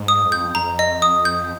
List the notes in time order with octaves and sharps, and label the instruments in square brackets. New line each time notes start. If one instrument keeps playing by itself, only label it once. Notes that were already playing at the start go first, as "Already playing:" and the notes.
Already playing: [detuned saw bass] G#2
[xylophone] D#6
[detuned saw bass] F2
[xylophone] G6
[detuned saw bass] F2 [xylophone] A#5
[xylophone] D#5
D#6
G6